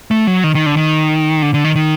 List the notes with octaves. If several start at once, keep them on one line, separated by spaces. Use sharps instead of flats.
A3
F#3
D#3
D#3
D3
D#3
D3
D3
D#3
D#3